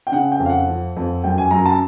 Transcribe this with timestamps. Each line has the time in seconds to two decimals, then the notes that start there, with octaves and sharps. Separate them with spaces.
0.07 G5
0.12 C#3 F#5
0.32 G5
0.40 F2
0.46 F5
0.49 F#5
0.68 F3
0.96 F2
1.24 F#2 G5
1.38 G#5
1.51 F#2 A#5
1.66 A5